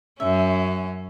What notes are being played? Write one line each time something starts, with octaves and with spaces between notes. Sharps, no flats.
F#2 C#4 E5